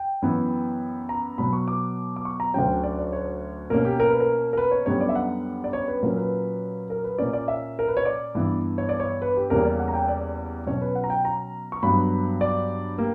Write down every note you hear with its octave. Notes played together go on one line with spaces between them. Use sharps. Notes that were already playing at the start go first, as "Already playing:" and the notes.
Already playing: G5
F#2 E3 B3
A#5
B2 F#3 B3 B5
C#6
D6
D6
C#6
A#5
D2 D3 F#3 C#4 G5
D5
D5
C#5
B2 A#3 C#4 A#4
G4
A#4
B4
A#4
A#4
B4
C#5
F#2 D3 G3 B3 C#5
D5
E5
F#5
D5
C#5
B4
A#2 F#3 A#3 C#4 A#4
B4
A#4
B4
A#2 A#3 C#4 D5
D5
E5
A#4
B4
C#5
D5
G2 E3 B3
C#5
D5
C#5
B4
G4
E2 C#3 G3 A#3 C#4 A#4
D5
F#5
A#5
G5
D5
B2 F#3 C#4 C#5
B4
F#5
A#5
G5
A#5
C#6
G2 F#3 B3 B5
D5
A#3 G4